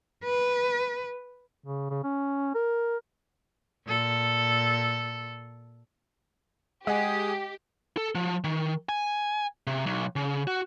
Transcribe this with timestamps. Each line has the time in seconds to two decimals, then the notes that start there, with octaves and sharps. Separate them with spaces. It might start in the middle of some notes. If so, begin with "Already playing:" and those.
0.24 B4
1.66 C#3
1.90 C#3
2.04 C#4
2.55 A#4
3.85 A#2 A4
6.87 G#3 G4 G#4 D#5 F#5 G#5 D#6
7.97 A4
8.15 F3
8.44 D#3
8.89 G#5
9.67 C3
9.86 B1
10.16 C#3
10.47 F#4